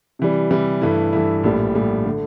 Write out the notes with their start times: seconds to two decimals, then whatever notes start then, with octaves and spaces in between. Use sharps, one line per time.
0.19 C3 E3 G3
0.51 C3 E3 G3
0.81 G2 E3 A3 E4
1.13 G2 E3 A3 E4
1.44 A#1 A2 G3
1.74 A#1 A2 G3
2.05 D3 A3